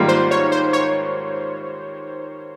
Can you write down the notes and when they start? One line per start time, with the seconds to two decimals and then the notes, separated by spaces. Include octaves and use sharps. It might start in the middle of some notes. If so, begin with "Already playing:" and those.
Already playing: G#2 D#3 G3 A#3 F4
0.08 C5
0.31 C#5
0.52 C5
0.73 C#5